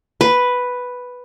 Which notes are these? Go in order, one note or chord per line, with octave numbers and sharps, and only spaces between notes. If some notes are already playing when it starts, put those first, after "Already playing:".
B4